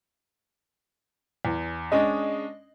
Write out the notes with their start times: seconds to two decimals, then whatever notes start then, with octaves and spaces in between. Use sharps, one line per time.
1.45 E2
1.92 G#3 C#4 D4 D#5